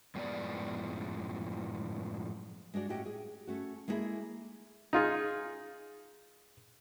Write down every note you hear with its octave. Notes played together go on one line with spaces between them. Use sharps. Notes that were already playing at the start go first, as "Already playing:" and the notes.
F#2 A2 F3 G#3 B3 D5
G#3 D4 F#4 D5
A2 C#4 F#4 G4 D#5 G5
G#4
A3 C#4 F#4
G#3 A#3 B3 E4 G#4 A4
D#4 F4 G#4